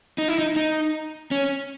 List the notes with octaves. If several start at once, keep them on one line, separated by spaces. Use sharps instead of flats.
D#4
E4
D#4
D#4
C#4